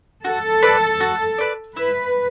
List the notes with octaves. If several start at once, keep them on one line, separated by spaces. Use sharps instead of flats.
F#4 A4
B4 D5
F#4
B4 D5
E4 B4